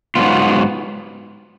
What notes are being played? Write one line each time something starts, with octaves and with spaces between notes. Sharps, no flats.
G#2 F#3 B3 F4